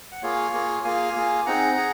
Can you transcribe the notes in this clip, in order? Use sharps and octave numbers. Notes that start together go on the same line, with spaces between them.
F#5
A#3 F4 G#4 C#5 F5
A#3 F4 G#4
A#3 F4 G#4 F5 G#5
A#3 F4 G#4
C4 D#4 G#4 F#5 A#5
G#4